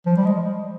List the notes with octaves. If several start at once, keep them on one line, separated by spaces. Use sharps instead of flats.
F3
G3
G#3